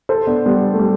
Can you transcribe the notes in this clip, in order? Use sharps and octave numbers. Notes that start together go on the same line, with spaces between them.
A4 C5
B3 D4
G3 B3
A3
G3